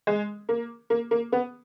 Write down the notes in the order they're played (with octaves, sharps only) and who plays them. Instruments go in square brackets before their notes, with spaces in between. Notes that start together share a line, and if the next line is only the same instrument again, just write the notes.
[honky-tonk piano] G#3
A#3
A#3
A#3
B3